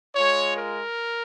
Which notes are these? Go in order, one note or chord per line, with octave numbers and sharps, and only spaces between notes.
G#3 F4 C#5
A#4